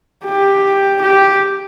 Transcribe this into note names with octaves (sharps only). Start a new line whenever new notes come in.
G4
G4